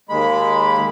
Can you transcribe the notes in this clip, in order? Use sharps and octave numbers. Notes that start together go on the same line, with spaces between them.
D#2 G#3 B5